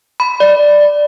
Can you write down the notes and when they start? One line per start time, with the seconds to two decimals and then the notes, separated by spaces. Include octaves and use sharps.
0.20 B5
0.40 D5